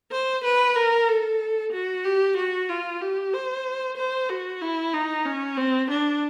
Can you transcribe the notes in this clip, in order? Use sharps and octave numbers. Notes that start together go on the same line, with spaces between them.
C5
B4
A#4
A4
F#4
G4
F#4
F4
G4
C5
C5
F#4
E4
D#4
C#4
C4
D4